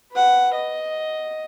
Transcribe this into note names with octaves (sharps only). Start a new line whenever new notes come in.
B4 F#5
D#5